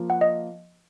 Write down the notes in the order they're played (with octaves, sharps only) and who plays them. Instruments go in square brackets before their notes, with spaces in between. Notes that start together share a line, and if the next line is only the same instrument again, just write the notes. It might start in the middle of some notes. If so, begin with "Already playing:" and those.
Already playing: [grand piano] F3 A#3 F4
[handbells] F#5
D#5